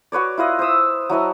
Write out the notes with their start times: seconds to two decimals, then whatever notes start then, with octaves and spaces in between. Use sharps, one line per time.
0.12 F#4 B4 C#5 D5
0.38 E4 F4 B4 D#5
0.59 C5 E5 D#6 E6
1.10 F#3 E4 D#5 A5